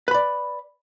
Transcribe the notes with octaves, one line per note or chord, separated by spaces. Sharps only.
B4 D5 B5